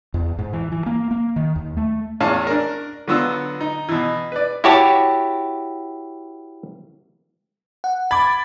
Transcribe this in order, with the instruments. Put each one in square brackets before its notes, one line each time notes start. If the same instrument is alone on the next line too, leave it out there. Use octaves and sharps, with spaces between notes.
[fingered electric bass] E2
G#2
E3
E3
A#3
A#3
D#3
D#2
A3
[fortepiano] E2 A2 C#4 F5 A5
D4 A#4
D3 F#3 B3 F4 E6
D#4
B2 E3
B4 D5
[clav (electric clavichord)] E4 F#4 G4 C#5 A5
[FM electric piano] F#5
[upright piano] B5 [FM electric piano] D6 G#6 A6